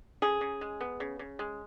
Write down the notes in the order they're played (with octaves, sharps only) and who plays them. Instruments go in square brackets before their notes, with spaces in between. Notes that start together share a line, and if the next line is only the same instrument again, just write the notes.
[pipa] C#3 G#4
C#3
G#3
B3
C#3
C#3
G#3